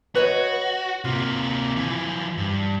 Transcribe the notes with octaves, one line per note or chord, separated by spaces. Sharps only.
F#4 B4 C#5 D#5
C3 A#3 F4
E3 F3
G2